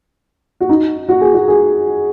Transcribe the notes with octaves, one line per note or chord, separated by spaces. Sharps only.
F#4
D#4
F#4
G#4
F#4
G#4